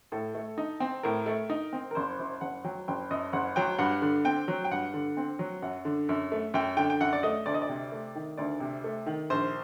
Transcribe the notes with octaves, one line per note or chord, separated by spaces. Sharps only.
A2 A4
A3
D#4
C4
A2 A#4
A3
D#4
C4
A#4
F#1 C5
F#2 C5
F#1 F#5
F#3 G5
F#1 G5
F#2 D#5
F#1 F#5
F#3 G5
G2 F#5
D3
C4 G5
F#3
G5
G2 F#5
D3
C4
F#3
F#2 F#5
D3
F#2
A3
F#2 G5
D3 G5
G5
F#2 F#5
D5
A3 D#5
D2 D5
D#5
D5
C3
A3
D#3
D2 D5
C3
A3
D#3
A#1 C5